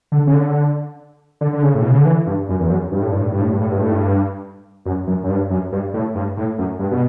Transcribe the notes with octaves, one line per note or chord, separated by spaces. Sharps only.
D3
C#3
D3
D3
D3
C#3
A2
B2
C#3
D3
E3
G2
F#2
E2
F#2
G2
A2
G2
A2
G2
A2
G2
A2
G2
A2
G2
F#2
F#2
F#2
G2
F#2
G2
A2
G2
A2
F#2
G2
B2